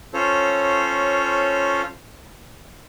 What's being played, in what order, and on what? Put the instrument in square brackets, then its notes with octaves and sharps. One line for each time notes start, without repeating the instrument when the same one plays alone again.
[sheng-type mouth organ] C#4 F4 A4 C5 C#5